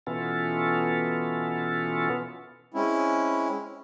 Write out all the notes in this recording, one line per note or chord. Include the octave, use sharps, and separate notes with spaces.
B2 E3 B3 C#4 F4 A4
G#3 C4 C#4 E4